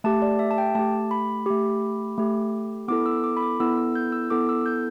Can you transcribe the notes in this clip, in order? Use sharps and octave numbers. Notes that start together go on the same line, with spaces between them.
A3 G4 A5
D5
E5
A5
G5
A3 G4 A5
B5
A3 G4
A3 G4
B3 E4 A4 D6
E6
D6
B5
D6
B3 E4 A4 E6
E6
G6
E6
B3 E4 A4 D6
E6
G6